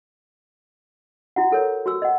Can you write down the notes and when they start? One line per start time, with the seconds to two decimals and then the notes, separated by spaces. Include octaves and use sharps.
1.36 E4 F#4 F#5
1.51 E4 A4 A#4 C#5
1.86 F#4 C#6 E6
2.02 D#5 F#5